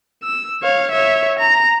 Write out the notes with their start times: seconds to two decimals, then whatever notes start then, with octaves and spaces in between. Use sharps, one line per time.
0.23 E6
0.63 C#5 F5
0.91 C#5 E5
1.39 A#5